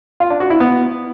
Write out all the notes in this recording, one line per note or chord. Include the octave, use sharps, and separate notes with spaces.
F4
D4
F#4
E4
B3